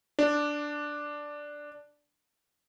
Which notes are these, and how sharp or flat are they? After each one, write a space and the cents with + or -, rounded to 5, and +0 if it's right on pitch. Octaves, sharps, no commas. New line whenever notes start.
D4 +0